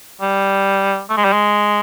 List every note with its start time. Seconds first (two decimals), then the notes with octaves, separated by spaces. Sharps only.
0.21 G3
1.09 A3
1.17 G#3
1.25 G3
1.33 G#3